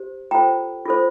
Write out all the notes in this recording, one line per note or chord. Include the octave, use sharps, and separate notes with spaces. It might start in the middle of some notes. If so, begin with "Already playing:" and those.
Already playing: G4 C5
F4 A4 C5 G5 A#5
F4 A4 C5